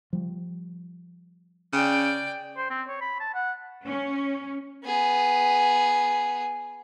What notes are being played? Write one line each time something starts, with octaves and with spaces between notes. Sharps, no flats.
F3 G3
C#3 D5 G5
C5
C4
C#5
B5
A5
F#5
C#4
B3 G#4